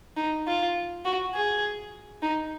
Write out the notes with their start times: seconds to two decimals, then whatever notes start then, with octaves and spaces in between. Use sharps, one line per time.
0.17 D#4
0.47 F4
1.05 F#4
1.34 G#4
2.22 D#4